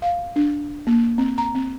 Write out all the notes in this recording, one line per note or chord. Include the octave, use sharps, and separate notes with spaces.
F5
D4
A#3
C4
A#5
C4